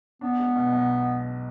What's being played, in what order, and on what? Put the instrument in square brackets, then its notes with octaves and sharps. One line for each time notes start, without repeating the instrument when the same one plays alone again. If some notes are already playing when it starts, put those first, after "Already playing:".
[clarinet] B3 [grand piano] D4
[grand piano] G#3
B2
B1